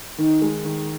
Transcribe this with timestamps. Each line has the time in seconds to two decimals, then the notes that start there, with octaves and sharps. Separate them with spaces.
0.18 D#3 D#4
0.42 G#3
0.65 D#3